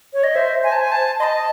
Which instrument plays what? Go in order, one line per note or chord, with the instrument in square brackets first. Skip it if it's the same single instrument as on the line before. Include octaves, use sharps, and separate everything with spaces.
[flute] C#5
D#5
[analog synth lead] C5 [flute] E5
[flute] G#5
A5
G#5
A5
[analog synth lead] D#5 [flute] C6
[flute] A5